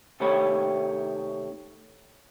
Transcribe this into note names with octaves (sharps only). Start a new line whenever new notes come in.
C3 D#3 A3 G4 C#5 B5